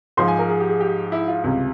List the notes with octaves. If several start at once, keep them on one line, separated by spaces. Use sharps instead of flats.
G#2 F3 C6
G#5
A#4
G#4
G4
G#4
G4
E4
F4
C#2 C3 G3